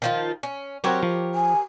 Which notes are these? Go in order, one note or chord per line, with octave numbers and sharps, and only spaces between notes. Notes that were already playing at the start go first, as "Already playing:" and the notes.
D#3 F3 F4
C#4
F#3 C4 F#4 G4 A#4 C#5
F3
G#5